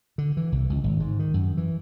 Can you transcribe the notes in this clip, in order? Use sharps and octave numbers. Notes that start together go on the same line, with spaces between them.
D3
E3
C2
C#2
G#1
G#2
D#3
F#2
E3